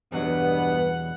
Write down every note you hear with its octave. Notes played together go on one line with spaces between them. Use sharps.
E2 G2 B2 F#3 B3 F#5